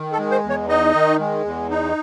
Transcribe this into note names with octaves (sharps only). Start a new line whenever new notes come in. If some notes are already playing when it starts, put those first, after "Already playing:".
Already playing: D#3
A4
G#3
C5
E2
C#5
D#4 D#5
D#3
G#3
E2
D#4